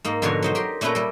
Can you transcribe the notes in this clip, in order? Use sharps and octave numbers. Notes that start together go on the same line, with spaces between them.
G#2 A#3 D#4
G#2 B2 D3 F3 A#4 C#5
F#3 D#4 C5
G4 A#4 C6
A#2 A3 C#4 E4 B4 A#5
G3 A4